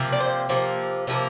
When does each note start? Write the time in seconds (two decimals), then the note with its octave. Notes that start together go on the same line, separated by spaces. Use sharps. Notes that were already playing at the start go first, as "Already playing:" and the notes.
Already playing: C3 F3 A#3
0.12 D5
0.20 C5
0.49 C3 F3 A#3
1.07 C3 F3 A#3